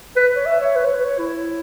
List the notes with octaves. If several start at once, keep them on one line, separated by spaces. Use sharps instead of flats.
B4
C#5
E5
C#5
B4
C#5
B4
C#5
E4